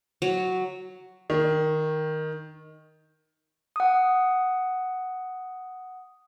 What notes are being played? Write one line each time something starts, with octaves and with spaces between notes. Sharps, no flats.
F#3
D#3
F#5 D#6